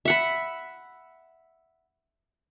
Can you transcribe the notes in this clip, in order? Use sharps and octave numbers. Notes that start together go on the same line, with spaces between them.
E5 F#5 B5